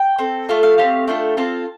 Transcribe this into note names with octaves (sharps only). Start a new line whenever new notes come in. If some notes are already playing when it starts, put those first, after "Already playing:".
Already playing: G5
C4 A4
A3 F4 A4 F5
F5
A3 C4 G4 F5
A3 D4 F4 A4 G5
C4 F4 A4 A5